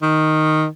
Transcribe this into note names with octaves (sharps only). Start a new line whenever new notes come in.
D#3